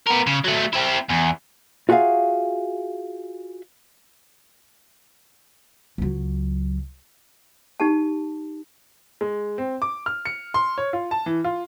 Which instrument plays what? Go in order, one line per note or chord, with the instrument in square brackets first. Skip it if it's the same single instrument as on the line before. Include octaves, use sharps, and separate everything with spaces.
[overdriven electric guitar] B3 A#4
C#3
F#3 A3
C4 E4
E2
[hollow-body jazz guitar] F4 F#4 G#4 E5 F5
[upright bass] C#2 F#3
[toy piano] D#4 G4 A5
[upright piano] G#3
C4
D6
F6
C#7
C6
C#5
F4
A5
E3
F4